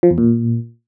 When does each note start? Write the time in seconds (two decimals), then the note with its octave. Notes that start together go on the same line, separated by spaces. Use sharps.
0.03 F3
0.10 E2
0.18 A#2